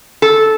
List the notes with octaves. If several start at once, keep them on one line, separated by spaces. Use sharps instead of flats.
A4